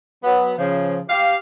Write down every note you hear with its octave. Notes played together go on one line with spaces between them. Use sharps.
F#3 B3
C#3 F3
G4 F5